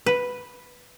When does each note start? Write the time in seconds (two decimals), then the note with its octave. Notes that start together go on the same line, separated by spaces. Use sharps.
0.06 B4